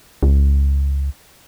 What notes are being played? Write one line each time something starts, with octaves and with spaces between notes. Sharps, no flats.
C#2